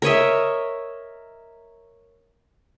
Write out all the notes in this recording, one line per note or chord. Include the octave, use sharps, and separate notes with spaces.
A#4 C#5 D#5 E5